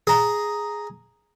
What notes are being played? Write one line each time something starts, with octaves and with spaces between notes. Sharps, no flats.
G#4 A#5